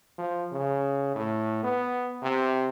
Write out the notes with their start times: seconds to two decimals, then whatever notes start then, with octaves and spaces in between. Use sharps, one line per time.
0.18 F3
0.52 C#3
1.15 A2
1.64 B3
2.23 C3